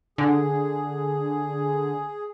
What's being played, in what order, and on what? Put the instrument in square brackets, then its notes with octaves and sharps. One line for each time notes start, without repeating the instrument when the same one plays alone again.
[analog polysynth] D3 [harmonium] G#4